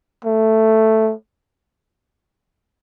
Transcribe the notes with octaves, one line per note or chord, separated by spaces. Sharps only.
A3